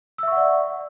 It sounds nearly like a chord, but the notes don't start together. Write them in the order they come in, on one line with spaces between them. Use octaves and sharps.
E6 E5 C#6 F#5 D5